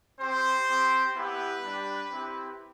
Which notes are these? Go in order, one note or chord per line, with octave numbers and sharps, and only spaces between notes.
C4 G4 C5
C4 G4
B3 E4 G4 B4
G3 D4 G4
C4 E4 G4